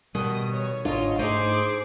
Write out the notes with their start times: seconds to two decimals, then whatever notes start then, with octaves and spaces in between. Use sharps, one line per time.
0.15 B2 D#3 G3 D#6
0.52 C#5
0.85 G1 G#2 D4 F4 C#5 D#5
1.19 G#2 A3 D#4 G#4 C5 D6